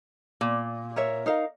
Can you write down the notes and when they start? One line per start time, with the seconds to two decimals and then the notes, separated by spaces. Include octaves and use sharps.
0.41 A#2
0.96 A#4 C#5 E5
1.26 D#4 A#4 F5